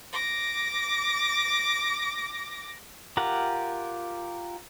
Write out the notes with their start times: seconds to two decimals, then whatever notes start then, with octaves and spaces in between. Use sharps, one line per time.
0.13 D6 A#6
3.17 F4 G4 A#4 F#5